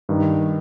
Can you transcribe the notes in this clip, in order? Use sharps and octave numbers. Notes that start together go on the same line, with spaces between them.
G2 D#3